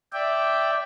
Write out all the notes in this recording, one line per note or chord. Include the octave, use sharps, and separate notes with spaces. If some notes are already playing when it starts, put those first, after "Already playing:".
D5 E5 G5